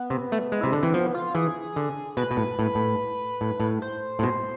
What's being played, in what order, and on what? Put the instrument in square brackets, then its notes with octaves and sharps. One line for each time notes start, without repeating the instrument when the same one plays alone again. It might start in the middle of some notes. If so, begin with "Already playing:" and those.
Already playing: [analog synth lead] B3
[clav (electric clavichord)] C3
A3
G#3
[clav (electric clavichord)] C3 [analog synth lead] E4
[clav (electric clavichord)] D3 [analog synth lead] D4
[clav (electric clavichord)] E3 [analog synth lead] C4
[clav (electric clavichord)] F3 [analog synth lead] B3
[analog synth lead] F4
[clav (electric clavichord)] E3 [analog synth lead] G#4
[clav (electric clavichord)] D3
[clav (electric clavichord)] B2 [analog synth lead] B4
[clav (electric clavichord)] B2
A2
A2
A2
A2
A2
[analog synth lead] C5
[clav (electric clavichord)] A2
B2